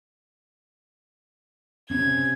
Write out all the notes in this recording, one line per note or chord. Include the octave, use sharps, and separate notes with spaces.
C3 C4 C#4 G#6